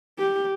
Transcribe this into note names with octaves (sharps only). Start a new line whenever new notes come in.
G4